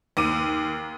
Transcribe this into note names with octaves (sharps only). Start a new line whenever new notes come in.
D#2 D6 D#7